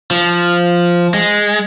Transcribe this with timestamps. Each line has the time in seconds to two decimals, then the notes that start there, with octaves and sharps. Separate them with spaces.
0.11 F3
1.14 G#3